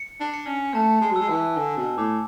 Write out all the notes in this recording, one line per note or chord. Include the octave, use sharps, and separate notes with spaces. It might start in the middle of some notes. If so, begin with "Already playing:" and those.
Already playing: C#7
D4
C#7
C#4
A3 A5
G#3
F#3
G#3 E6
E3
D3 G#5
B2
A2 D6